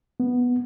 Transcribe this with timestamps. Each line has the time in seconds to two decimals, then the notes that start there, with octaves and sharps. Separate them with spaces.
0.20 B3